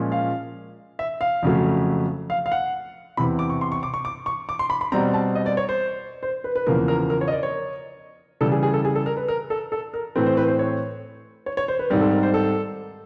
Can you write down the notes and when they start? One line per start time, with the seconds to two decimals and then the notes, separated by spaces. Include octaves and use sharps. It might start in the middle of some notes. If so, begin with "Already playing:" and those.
Already playing: A#2 F3 G#3 C#4
0.12 F5
0.99 E5
1.21 F5
1.43 F2 C#3 F#3 A3
2.30 F5
2.46 F5
2.52 F#5
3.17 E2 C3 E3 B5
3.39 D6
3.50 C#6
3.61 C6
3.72 C#6
3.83 D6
3.94 C#6
4.05 D6
4.26 C#6
4.49 D6
4.59 C6
4.70 B5
4.81 B5
4.92 B2 G3 C4 A#5
5.14 A5
5.35 D#5
5.46 D5
5.57 C#5
5.69 C5
6.23 C5
6.44 B4
6.56 B4
6.67 E2 C#3 F3 A#3 A#4
6.88 A#4
7.10 A#4
7.21 C#5
7.28 D#5
7.32 D5
7.43 C#5
8.41 C#3 E3 G3 A4
8.52 G#4
8.63 G#4
8.74 A4
8.85 G#4
8.95 A4
9.06 A#4
9.17 B4
9.28 A#4
9.50 A4
9.72 A4
9.94 A#4
10.15 A2 E3 A3 C4 B4
10.26 C5
10.37 B4
10.48 C5
10.59 C#5
11.46 C#5
11.57 C#5
11.68 C5
11.79 B4
11.90 G#2 D#3 G3 C4 A#4
12.01 A4
12.12 A#4
12.23 C5
12.34 A4